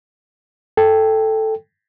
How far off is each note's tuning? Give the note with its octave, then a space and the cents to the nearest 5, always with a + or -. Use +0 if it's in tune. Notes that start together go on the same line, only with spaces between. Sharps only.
A4 +0 G5 +5